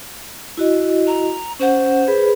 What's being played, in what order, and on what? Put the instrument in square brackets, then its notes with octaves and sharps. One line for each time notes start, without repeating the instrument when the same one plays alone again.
[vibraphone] E4 F#4 D#5
[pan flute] A#5
[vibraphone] C#4 F#5 [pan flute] C5
[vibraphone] G#4 B4 B5